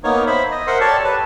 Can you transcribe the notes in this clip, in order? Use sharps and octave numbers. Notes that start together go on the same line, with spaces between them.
A#3 B3 D#4 C#5
C5 E5 B5
D#5
A#4 C5 E5 F#5 C6
G4 A4 C#5 D5 A5
B4 A5